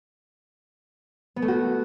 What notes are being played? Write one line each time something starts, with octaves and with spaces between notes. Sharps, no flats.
B3
A3
F#4